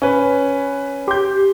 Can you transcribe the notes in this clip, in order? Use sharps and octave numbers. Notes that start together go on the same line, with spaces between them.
C#4 B4
G4 C6 G6